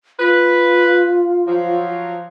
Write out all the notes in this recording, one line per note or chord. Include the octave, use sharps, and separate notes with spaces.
F4 B4
F3 F#3